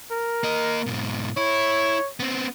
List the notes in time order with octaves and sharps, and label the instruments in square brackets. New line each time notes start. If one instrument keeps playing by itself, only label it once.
[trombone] A#4
[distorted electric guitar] A#3 D#5
G#2 B2
[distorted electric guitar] E4 [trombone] C#5
[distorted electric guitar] B3 C4